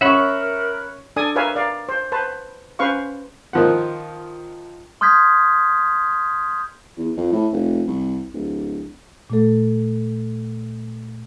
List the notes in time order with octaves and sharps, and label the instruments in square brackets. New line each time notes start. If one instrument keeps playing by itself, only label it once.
[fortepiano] C#4 C#6 [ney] A#4 [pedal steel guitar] E5 F#5 B5
[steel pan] D4 A4 D5 G#5 D#6
A#4 B4 C#5 E5 F5 G#5
A#4 D5 F5
C5
B4 C5 A5
C#4 B4 C5 F5 C#6
[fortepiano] D#3 F3 F#5
[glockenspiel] C6 D#6 F6 G6 G#6 B6
[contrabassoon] E2
F2
A2
F1
C2
D1
[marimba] A#2 A3 A4